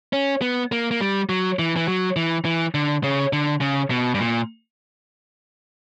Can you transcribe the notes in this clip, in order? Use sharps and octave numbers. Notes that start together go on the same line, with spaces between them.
C#4
B3
A#3
A#3
G3
F#3
E3
E3
F#3
E3
E3
D3
C#3
D3
C#3
B2
G2
A#2